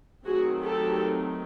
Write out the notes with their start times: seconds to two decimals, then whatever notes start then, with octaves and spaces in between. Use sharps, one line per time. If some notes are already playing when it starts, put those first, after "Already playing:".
0.25 D#3 F#3 A3 C4 F#4 G#4
0.62 G4 A4